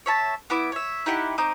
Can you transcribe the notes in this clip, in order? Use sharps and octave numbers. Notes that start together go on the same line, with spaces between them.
C#5 E5 A5
B3 E4 D6
C#5 E5
D#4 E4 G4 F#5
C4 D#4 D6 D#6